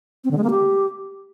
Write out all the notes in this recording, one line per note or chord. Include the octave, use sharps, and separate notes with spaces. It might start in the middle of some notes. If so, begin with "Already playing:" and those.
C4
D3
G#3
A#3
G4